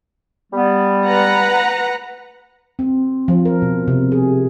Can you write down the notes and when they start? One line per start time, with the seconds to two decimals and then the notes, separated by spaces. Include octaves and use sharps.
0.53 G3 B3
1.06 B4 F#5 A#5
2.79 C4
3.28 F3
3.45 A#4
3.62 B2
3.88 C3
4.12 G#4